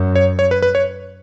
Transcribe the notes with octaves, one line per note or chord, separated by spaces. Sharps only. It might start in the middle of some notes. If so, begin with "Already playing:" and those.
Already playing: F#2
C#5
C#5
B4
B4
C#5